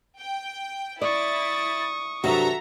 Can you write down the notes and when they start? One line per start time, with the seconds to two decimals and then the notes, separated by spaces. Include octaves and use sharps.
0.19 G5
1.02 E4 D5 C#6 D#6 A6
2.24 G2 C3 F#3 F#4 A4 E5 A#5